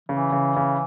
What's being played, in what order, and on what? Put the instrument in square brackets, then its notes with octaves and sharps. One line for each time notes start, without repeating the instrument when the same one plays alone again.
[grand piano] C#3 [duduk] E3
[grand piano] C#3
C#3